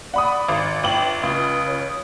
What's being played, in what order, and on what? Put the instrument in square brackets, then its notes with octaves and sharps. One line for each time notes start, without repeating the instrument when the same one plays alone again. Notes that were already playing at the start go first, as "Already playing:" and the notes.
[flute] D5 [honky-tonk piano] F#5 B5 D#6
[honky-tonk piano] G#1
[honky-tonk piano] G1 F#7 [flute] G5
[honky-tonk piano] C#2 [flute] D#6
[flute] C#5
D#6